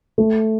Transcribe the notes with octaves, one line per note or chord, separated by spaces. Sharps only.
A3